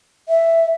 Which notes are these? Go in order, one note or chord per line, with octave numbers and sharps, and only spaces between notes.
E5